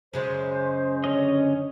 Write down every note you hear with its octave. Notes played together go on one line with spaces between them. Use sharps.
F#2 C#3 G#3 C5
D3 C#4 C#5 D#5